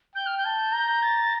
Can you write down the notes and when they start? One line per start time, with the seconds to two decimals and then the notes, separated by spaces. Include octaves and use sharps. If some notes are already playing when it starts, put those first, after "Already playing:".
0.15 G5 G6
0.26 F6
0.38 G6
0.45 A5
0.73 A#5
1.03 A6